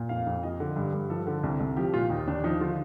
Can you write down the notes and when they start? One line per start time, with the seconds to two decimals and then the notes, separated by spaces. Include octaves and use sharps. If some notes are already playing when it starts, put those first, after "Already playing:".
Already playing: A#2
0.09 F2 F5
0.26 F2
0.43 F3 D#5
0.60 D3
0.76 G2
0.93 G2
1.10 F3 A4
1.27 D3
1.43 C2
1.60 C2
1.77 F3 G4
1.94 A#2 F4
2.10 D#2 D#4
2.27 D#2 D4
2.44 F3 D#4
2.61 D3 F4